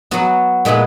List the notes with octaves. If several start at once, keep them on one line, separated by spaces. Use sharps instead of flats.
F#3 B3 F#4
A#2 G#3 B3 E4 B4